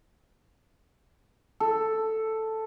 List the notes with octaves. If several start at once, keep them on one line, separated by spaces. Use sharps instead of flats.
A4